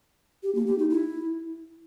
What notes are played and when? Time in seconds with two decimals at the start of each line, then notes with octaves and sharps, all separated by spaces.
0.43 G4
0.55 A#3
0.67 G4
0.78 D#4
0.90 E4